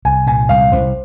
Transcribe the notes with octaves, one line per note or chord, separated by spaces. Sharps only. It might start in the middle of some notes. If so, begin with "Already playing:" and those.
C2 G#5
A#2 G#5
C2 F5
C2 C5